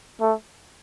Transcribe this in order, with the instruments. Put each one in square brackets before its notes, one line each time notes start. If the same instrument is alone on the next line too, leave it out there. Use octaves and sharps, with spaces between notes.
[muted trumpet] A3